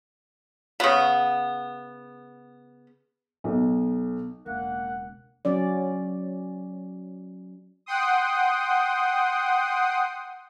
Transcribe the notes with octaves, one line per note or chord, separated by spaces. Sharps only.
C#3 B3
B1
E1 C#2 A#3 F#5
F#3 C#4 D5
F#5 G5 C6 D#6